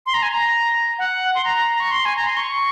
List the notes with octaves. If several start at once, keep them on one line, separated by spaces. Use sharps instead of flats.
C6
A#5
G#5
A#5
F#5
C6
A#5
C#6
C6
G#5
A#5
C6
C#6